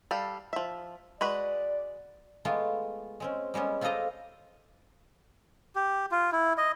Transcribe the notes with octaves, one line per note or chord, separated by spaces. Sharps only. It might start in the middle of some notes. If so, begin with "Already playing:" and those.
G3 A4 F5
F3 E5
G#3 F#4 B4 D5
G#3 A3 B3 F4
G#3 C4 C#4
G3 G#3 B3 C#4
C4 F4 G4 A4 D#5 A#5
G4
F4
E4
D#5